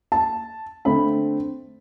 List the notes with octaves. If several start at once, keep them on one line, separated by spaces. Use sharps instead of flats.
A5
D3 A3 C4 B5